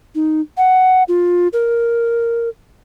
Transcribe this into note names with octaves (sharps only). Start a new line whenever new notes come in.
D#4
F#5
F4
A#4